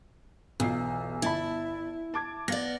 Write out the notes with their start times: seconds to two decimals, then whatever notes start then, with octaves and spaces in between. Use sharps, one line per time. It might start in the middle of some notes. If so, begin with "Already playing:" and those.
0.60 B1 E2 F4 C7
1.22 G1 E4 A5 B5
2.14 A5 D6 G#6
2.48 B3 D5 F5 A#6